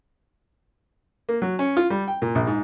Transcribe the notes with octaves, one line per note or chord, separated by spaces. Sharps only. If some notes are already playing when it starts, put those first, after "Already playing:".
A#3
F#3
C#4
F4
G3
G5
A#2
A#1
G#2